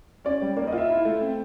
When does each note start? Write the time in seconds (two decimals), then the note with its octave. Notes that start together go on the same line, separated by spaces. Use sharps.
0.25 C#4 D5
0.42 G3
0.57 A#3 D5
0.67 D#5
0.72 F4
0.78 E5
0.89 E4
1.05 A3
1.21 C4